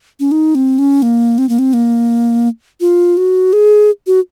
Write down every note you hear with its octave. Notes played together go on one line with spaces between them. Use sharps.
C#4
D#4
C4
C#4
A#3
C4
A#3
C4
A#3
F4
F#4
G#4
F#4